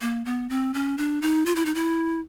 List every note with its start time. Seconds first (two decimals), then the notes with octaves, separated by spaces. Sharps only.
0.01 A#3
0.25 B3
0.49 C4
0.74 C#4
0.98 D4
1.22 D#4
1.46 F4
1.55 E4
1.65 D#4
1.75 E4